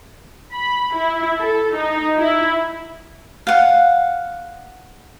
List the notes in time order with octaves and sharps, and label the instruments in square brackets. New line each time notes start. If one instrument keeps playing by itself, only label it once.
[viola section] B5
E4
A4
D#4
E4
[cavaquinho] F5 F#5